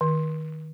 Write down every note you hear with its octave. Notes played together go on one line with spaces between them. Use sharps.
D#3